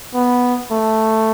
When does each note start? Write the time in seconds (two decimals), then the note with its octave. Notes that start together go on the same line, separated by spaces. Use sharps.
0.14 B3
0.72 A3